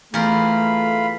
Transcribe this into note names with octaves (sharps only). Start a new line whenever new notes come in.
E2 A3 F4 A#4 B5